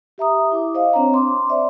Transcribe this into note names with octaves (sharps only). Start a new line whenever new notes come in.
G4 E5 A#5 D#6
E4 D6
C5 D#5 F5
C4 D4 C#5 A#5
C6 D6
C5 D5 E5